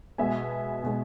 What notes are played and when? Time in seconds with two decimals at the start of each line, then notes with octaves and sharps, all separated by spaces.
0.18 B2 G#3 B3 E5 G#5
0.84 B2 G#3 B3